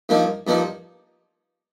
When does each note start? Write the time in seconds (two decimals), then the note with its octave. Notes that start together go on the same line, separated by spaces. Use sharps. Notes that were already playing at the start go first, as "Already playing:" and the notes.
0.09 G2 F3 A#3 D#4
0.47 G2 F3 A#3 D#4